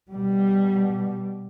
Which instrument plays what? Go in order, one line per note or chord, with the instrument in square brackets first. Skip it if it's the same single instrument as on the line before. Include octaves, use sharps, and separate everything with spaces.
[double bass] B2 G3